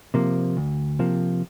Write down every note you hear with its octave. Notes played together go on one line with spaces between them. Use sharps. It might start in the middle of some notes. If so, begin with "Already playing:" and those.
C3 F3 A#3
D2
C3 F3 A#3